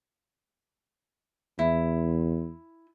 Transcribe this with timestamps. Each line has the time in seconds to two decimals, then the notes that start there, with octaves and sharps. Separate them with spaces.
1.59 E2 E4